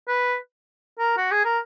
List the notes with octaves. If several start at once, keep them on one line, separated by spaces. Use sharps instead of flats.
B4
A#4
F#4
G#4
A#4